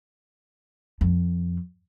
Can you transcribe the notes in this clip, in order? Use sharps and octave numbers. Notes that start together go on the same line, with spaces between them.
F2